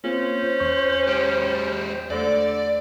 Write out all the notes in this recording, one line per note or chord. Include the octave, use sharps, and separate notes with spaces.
A#3 C4 C#4 F4 C5
E2 C#6
G#3 G4
E2 D3 A3 D5